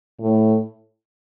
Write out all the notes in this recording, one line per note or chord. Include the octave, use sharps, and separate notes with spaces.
A2